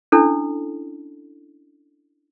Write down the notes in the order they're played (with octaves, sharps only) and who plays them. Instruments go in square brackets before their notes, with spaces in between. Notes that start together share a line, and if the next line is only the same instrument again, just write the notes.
[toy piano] C#4 D4 E4 A4